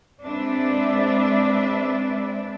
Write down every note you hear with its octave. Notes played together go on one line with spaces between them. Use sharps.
G#3 C4 D4 B4 D5 E5